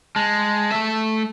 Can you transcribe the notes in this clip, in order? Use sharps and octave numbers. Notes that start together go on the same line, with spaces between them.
G#3 A5
A3 E5